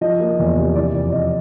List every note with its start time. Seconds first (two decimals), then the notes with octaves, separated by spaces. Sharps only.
0.01 F3 D#5
0.20 A#3
0.39 E2
0.58 C3
0.75 E3 D5
0.95 F2
1.12 F2 D#5